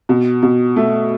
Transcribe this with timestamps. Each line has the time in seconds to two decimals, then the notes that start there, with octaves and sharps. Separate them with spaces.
0.09 B2
0.43 B2
0.76 A3